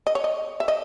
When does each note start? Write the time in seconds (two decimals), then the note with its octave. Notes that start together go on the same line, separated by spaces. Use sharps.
0.07 D#5
0.15 C#5
0.24 D#5
0.60 E5
0.68 D#5